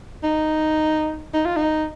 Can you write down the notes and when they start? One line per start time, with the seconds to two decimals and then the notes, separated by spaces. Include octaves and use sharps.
0.23 D#4
1.34 D#4
1.45 F4
1.56 D#4